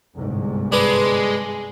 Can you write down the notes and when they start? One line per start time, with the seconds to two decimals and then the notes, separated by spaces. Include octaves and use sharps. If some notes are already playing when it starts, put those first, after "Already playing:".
0.16 G1 C2 G#2
0.72 G#3 D4 B4